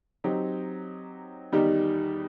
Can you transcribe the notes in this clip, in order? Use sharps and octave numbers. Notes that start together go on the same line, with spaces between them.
F#3 C4 D#4 G4
E2 D#3 G3 D#4 G4